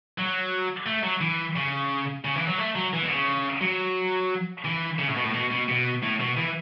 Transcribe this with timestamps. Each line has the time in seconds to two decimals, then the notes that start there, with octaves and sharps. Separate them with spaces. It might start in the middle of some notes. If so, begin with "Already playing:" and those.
0.18 F#3
0.86 A3
1.03 F#3
1.21 E3
1.56 C#3
2.25 C#3
2.36 E3
2.47 F#3
2.58 A3
2.75 F#3
2.93 E3
3.03 B2
3.10 C#3
3.61 F#3
4.65 E3
4.98 C#3
5.08 A2
5.16 B2
5.24 A2
5.34 B2
5.50 B2
5.68 B2
6.03 A2
6.20 B2
6.37 E3